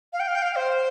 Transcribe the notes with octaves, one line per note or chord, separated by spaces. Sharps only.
F5
G5
F5
G5
F5
C5